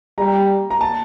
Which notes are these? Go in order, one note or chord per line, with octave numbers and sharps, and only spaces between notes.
G3 A#5
A#5
A5